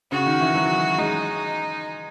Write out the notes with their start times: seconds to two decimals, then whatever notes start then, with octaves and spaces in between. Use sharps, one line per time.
0.12 C#3 F#4
0.26 D#3
0.41 E3
0.55 F#3
0.98 G#3 D#4